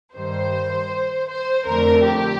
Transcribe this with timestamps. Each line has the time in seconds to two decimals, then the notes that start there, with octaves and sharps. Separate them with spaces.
0.15 G2 D#3 G3 C5
1.29 C5
1.66 F2 D3 A3 A#4
2.05 G4